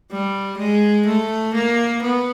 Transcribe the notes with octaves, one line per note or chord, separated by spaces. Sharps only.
G3
G#3
A3
A#3
B3